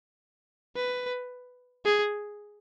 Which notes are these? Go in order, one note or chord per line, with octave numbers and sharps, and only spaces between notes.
B4
G#4